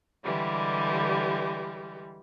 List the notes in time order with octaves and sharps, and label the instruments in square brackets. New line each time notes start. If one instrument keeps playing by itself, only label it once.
[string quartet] D3 E3 G3 G#3 G4